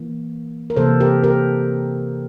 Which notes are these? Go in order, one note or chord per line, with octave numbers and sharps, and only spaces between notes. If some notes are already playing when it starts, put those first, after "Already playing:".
Already playing: E3 A#3
A#4
C3 E3 A#3 A4 C5
G4 A#4
G4 A#4